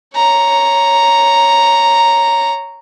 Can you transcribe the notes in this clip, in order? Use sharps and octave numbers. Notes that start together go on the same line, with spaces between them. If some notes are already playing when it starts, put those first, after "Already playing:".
C#5 A#5